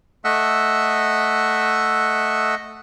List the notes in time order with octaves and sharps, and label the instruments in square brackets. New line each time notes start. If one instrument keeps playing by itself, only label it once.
[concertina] A3 D#5 E5 F#5 E6